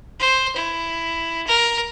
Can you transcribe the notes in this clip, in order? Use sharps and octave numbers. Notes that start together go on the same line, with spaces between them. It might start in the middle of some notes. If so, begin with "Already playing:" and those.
C5
E4
A#4